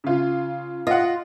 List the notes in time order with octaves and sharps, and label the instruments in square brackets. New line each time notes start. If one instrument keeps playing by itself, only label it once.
[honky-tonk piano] C#3 F4
[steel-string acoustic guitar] F4 [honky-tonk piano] D#5 F#5